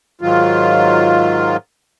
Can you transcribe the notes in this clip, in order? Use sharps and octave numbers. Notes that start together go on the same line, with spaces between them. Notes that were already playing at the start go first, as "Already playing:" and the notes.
G#2 D#3 F#3 F4